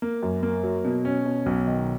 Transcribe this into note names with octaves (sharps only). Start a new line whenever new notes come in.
A#3
F#2
A#3
F#3
B2
C#4
B2
B1
D#3